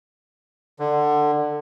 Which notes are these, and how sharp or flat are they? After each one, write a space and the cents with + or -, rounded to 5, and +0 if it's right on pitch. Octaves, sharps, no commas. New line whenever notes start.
D3 +20